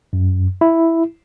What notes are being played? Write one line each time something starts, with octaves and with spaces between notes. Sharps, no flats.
F#2
E4